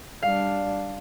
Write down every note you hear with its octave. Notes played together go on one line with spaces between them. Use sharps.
G3 D4 F5